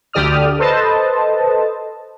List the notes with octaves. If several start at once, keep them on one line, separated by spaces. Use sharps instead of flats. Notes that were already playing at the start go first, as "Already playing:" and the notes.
D2 D3 G4 D5 D#6 F6
A4 B4 C5 D#5 A5